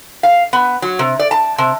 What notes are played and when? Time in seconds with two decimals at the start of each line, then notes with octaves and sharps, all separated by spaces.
0.23 F5
0.53 B3
0.82 F#3
0.99 C3
1.19 D5
1.31 A5
1.58 C3